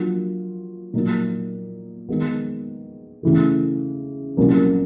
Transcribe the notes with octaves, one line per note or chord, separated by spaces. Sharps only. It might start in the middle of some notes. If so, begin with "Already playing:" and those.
Already playing: F#3 A#3 D4 F4
A#2 F#3 A#3 D#4
D#3 G#3 B3
C#3 E3 A3
C2 A#2 F#3 A#3 C#4